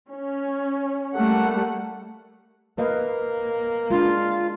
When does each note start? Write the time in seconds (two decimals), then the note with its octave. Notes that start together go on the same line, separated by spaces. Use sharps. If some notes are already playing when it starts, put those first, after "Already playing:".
0.11 C#4
1.14 G3 A3 A#3 F#5
2.78 A#3 B4 D#5 F5
3.90 G#3 D4 F4